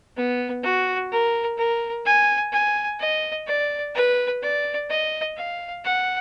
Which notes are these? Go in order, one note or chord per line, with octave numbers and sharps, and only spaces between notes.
B3
F#4
A#4
A#4
G#5
G#5
D#5
D5
B4
D5
D#5
F5
F#5